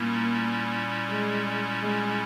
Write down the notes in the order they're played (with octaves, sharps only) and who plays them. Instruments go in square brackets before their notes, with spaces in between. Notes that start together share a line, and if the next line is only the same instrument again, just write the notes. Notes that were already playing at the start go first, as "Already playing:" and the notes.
Already playing: [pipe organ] A#2 G3 C#4 E4 [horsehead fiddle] A#3
[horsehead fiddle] G#3
G#3